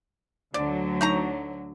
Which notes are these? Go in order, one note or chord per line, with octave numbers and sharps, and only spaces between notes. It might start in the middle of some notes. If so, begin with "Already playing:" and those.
D2 D3 F#3 D5
D#4 C#5 A#5